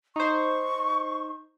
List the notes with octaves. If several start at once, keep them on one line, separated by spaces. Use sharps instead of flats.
D#4 C5 C#6